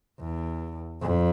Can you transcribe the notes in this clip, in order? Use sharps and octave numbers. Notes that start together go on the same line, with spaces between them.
E2
F2